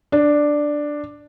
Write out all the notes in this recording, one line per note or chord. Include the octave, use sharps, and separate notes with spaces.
D4